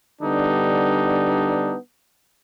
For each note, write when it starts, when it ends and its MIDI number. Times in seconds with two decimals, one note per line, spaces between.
0.21 1.75 50
0.21 1.75 55
0.21 1.75 59
0.21 1.75 62
0.21 1.75 63